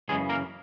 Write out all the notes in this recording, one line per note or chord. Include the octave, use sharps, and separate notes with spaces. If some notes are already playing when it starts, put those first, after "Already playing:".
F#2 C#3 E3 G#3 G#4
A#3 A#4